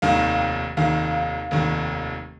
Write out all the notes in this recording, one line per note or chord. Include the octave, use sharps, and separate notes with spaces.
F1 D#2 D#3 F5
F1 D#2 D#3 F5
F1 D#2 D#3